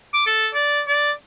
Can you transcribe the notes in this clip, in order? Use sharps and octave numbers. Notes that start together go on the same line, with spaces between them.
D6
A4
D5
D5